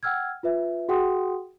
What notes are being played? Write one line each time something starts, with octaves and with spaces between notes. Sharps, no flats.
F#5 G5 E6 F6 G#6
F4 B4 E5
F#4 G#4 F#5 G5 C6 D#6